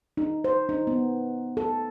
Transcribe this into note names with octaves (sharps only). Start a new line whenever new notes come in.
D#4
C5
D#4
B3
A4